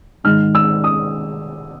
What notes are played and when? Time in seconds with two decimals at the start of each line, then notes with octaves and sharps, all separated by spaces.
0.24 G#2 D#3 G#3 F6
0.55 E6
0.84 D#6